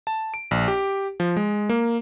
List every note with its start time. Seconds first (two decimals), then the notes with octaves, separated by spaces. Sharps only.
0.07 A5
0.34 D7
0.51 A#1
0.68 G4
1.20 F3
1.37 G#3
1.69 A#3